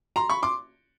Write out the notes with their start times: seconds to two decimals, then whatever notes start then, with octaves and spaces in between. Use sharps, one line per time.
0.16 A#5 C6
0.30 B5 C#6
0.43 C6 D6